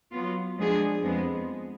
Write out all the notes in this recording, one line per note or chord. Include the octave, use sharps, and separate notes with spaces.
F#3 B3 F4
F3 G#3 B3 D4 G#4
F2 F3 G#3 B3